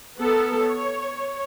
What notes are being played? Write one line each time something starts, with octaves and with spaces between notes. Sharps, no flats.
B3 A4 A#4
C#5